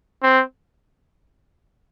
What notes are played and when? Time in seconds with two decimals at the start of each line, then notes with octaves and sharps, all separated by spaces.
0.23 C4